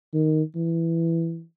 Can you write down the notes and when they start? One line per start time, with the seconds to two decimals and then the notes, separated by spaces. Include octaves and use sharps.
0.13 D#3
0.55 E3